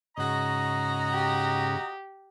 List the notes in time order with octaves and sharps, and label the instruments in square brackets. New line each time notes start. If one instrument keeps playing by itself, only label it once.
[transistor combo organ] G#2 C#3 [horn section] F#4 D#5 A#5
[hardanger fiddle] G4